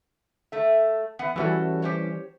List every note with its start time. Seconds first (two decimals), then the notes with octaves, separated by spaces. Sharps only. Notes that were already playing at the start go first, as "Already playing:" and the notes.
0.52 A3 E5
1.19 E3 B3 F#5
1.36 E3 G3 C#4 E4 F#4 A4
1.82 G4 C5 C#5